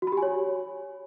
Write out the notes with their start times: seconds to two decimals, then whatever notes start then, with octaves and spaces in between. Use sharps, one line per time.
0.02 F#4
0.07 B5
0.12 G4
0.17 G#5
0.22 C#5